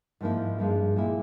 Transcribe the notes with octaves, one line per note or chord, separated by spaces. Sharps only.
G#2 F3 A#3 E4
G2 F3 G#3
A#2 G#3 E4